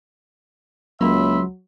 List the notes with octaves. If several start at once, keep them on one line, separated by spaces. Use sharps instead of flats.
C#2 F#3 A#3 E5 B5 C6